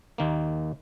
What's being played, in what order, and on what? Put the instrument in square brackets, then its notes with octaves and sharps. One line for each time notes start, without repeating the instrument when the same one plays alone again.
[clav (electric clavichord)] D#2 D#3 A#3